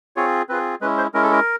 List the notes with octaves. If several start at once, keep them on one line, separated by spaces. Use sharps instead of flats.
C4 F4 G#4 C#5
C4 F4 G#4 B4
G#3 C#4 E4 B4
C5
G#3 C#4 E4 A#4
A4
A#4